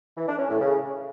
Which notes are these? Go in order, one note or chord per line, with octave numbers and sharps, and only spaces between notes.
E3
D4
C#4
A2
C#3